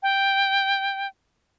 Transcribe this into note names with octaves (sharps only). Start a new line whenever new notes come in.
G5